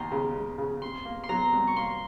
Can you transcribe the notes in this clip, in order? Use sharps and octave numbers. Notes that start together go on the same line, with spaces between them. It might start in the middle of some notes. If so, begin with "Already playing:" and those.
Already playing: D#2 A#5 C6
C#3
G#3
C#3
C3 C6
A#3
C6
F#3 A#5
C2
C#6
A#3 C6